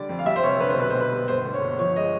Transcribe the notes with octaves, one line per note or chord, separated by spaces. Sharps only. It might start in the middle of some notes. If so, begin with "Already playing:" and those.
Already playing: D3 G3 D5
F2
F5
G3 E5
C5
F1 C#5
D3 B4
C5
B1 B4
B1 C5
B4
G3
G1 C5
D3
C#5
G1
F3 C#5
G#3 D#5